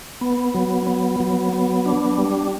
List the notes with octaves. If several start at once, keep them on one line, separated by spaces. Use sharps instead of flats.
B3
F#3
B3
F#3
B3
D4
G3